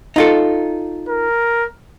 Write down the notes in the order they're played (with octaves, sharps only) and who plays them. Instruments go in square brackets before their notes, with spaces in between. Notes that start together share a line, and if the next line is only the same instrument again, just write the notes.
[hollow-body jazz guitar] D#4 F4 A4
[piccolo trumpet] A#4